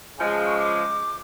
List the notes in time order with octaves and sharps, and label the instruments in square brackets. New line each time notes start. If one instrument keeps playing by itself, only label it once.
[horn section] C#3 F3 G#3 [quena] G#5
[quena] A5
C#6
D6